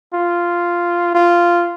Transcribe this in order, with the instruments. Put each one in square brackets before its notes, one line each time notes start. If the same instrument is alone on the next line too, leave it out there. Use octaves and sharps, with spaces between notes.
[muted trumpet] F4
F4